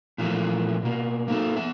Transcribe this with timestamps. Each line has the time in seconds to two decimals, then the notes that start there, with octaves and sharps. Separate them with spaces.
0.18 A#2 E3 F3 G3 A3 A#3
0.83 B2 A#3
1.28 A#3 D#4 A4
1.57 B3 E5